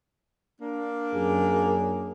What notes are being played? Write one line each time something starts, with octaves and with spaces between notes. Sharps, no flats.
A#3 D4
F#2 G#4